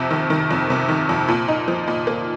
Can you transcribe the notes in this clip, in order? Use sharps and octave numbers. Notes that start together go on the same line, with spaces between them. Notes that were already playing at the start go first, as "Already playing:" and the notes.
Already playing: F2 C3
D#3
D#3
F2
C3
D#3
F2
A#2
D#4
F3
A#2
A#3